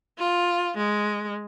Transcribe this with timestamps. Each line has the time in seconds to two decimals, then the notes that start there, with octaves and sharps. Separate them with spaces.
0.19 F4
0.77 G#3